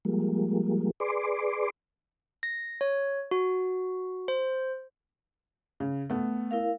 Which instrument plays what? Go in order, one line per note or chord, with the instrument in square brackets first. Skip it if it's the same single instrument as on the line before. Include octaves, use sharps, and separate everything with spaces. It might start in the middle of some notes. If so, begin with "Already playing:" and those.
[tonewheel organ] F3 G3 G#3 A#3
G#4 B4 D5 C6 D6
[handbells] A#6
C#5
F#4
C5
[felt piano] C#3
A3 B3
[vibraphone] E4 A#4 F5